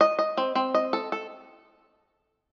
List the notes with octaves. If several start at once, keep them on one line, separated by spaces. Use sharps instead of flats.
D#5
D#5
C4
C4
D#5
A4
A4